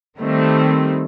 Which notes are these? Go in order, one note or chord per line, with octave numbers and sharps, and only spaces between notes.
D#3 G3 A3 C4